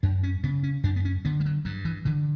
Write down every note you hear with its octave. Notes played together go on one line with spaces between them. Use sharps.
F#2 D4
C#4
C#3 B3
C#4
F#2 D4
B3
C#4
D3 B3
G3
F#3
G2 F#3
E3
D3 E3